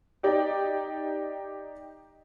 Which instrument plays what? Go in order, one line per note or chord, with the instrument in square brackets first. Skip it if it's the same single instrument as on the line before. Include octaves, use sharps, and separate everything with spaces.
[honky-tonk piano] D#4 G4 D5 D#5 G5